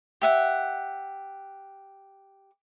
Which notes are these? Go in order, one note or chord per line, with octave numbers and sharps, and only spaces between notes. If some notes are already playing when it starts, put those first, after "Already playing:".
G4 E5 F#5